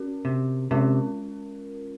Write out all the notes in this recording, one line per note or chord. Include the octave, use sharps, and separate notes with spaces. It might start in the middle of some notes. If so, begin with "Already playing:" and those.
Already playing: C#4 F#4 A#4
C3
C3 G#3 C#4 F4 A#4